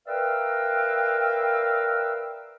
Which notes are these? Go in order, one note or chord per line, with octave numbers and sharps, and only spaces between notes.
A#4 B4 D5 E5 F5 G5